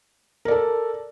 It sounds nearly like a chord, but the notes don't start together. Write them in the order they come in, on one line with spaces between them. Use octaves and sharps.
A#4 D5 A4